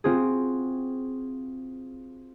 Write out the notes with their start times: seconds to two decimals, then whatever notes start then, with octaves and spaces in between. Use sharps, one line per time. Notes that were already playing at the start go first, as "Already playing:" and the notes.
0.04 C4 F4 F#4 G#4